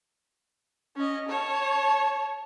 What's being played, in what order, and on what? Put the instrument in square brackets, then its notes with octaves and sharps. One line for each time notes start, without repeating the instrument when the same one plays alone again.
[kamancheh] C#4 D#5
C#5 A5